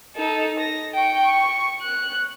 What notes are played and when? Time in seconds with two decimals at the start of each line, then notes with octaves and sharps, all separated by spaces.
0.16 D#4 A4
0.59 A#6
0.94 G5 C#6
1.23 C#6
1.82 F#6